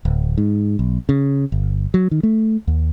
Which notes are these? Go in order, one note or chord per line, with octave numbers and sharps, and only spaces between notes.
D1
G#2
B1
C#3
G1
F#3
D#3
A3
D#2